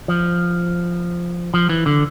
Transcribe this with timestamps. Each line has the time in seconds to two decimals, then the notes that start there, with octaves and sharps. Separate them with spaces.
0.08 F3
1.54 F3
1.69 E3
1.86 D3